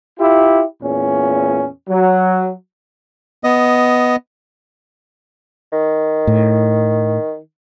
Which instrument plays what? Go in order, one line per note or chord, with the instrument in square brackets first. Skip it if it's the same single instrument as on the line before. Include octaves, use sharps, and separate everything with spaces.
[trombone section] E4 F4 G4
E2 A#2 C#4
F#3
[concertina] B3 D#5
[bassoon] D#3
[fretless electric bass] A2